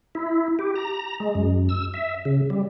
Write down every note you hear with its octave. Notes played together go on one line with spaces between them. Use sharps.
E4
G4
A#5
G#3
F#2
E6
E5
C#3
G3